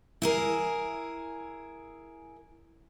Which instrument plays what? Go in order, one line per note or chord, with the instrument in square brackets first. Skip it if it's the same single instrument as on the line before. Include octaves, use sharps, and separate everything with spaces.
[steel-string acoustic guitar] E4 G#4 A#4